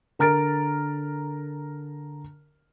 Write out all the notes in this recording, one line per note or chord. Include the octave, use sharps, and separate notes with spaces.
D3 A#4 A#5 F6 A6 D7